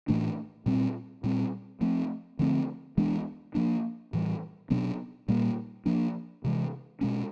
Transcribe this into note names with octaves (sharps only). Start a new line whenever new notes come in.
A2 E3 A3 D4
A#2 G3 C4
A#2 G3 C4
F3 A3 C4
D3 F3 A3 C4
E3 G#3 B3 D4
F3 A#3 D4
A2 E3 G3
B2 F#3 B3 D4
A#2 G3 A#3
F3 A#3 D4
C3 E3 G#3
B2 G#3 C#4